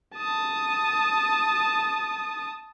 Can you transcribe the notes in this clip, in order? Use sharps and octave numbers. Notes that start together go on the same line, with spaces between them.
A5 D#6